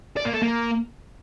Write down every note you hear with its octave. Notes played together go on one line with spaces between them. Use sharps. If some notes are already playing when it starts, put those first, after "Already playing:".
D5
A#3
A4
A#3